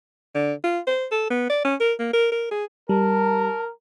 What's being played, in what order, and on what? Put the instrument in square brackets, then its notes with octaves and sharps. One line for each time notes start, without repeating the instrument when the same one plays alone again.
[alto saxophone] D3
F4
C5
A4
B3
D5
C#4
A#4
A#3
A#4
A#4
G#4
[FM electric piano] G3 [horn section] A#4 [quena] A5